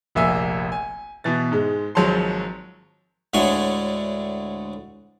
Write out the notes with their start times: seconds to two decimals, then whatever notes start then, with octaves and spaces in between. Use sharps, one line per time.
0.15 F1 A#1 A#3 E5 G#5 E6
0.72 G#5
1.24 B2 E3 A6
1.52 G#2 G#3
1.95 G#1 F3 F#3 G#3 A5 C6
3.34 D2 A2 D3 G#3 C#5 G#5